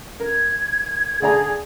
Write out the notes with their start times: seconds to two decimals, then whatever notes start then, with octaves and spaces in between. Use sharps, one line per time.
0.20 A#4 G#6
1.22 D3 G#4 D5 A#5